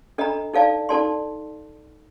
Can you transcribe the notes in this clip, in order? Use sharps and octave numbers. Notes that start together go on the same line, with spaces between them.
D4 A4 D#5 A#5
D#4 A4 D5 F5 A5
D#4 A4 D5 A5 C6